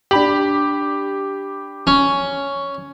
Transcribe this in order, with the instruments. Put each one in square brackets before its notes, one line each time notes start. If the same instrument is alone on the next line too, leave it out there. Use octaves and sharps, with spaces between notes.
[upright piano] D4 B5 F#7 [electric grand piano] G4
[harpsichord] C#4